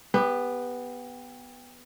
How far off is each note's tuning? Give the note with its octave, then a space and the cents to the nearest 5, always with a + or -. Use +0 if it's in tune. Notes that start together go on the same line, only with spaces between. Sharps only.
B3 +0 G4 +25